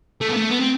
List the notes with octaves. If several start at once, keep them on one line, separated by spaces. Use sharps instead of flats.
A3
B3
A3
B3
C4